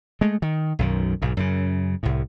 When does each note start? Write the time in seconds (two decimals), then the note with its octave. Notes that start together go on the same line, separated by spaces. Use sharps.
0.21 G#3 A3
0.42 D#3
0.79 B1 F#2 D#3
1.22 B1 G#2
1.37 F#2 C#3
2.03 C2 A2